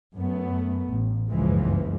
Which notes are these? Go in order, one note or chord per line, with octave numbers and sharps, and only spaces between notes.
F#2 A3 B3
A1
F#1 C#2 G2 E3 F3 G#3